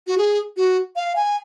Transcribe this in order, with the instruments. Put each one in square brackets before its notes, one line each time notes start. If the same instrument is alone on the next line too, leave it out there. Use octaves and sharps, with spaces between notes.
[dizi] F#4
G#4
F#4
F5
G#5